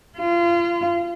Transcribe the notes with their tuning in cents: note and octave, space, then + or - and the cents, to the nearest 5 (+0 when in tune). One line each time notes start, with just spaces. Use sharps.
F4 -30